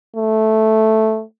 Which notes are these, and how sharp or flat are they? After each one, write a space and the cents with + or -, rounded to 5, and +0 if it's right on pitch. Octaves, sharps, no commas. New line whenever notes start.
A3 -5